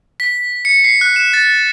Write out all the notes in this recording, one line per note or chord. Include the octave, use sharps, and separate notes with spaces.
B6
C#7
C7
F#6
E7
A6